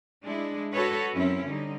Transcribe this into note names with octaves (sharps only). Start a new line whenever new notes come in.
G#3 D4 E4
F#4 A4 B4 C#5
F#2 C4 C#4 E4
D3 G3 D#4